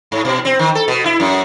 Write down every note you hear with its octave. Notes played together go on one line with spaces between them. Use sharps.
G#2
B2
C4
D#3
A4
B2
E4
F#2